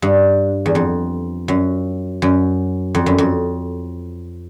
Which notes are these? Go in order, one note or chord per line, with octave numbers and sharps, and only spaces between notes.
G2
E2
F2
F#2
F#2
F2
F#2
F2